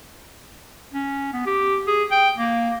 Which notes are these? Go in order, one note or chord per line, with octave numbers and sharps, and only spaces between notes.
C#4
B3
G4
G#4
G5
A#3